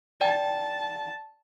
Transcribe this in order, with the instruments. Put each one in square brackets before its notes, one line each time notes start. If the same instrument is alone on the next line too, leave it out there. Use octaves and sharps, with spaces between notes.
[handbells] D5 G5 [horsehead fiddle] A5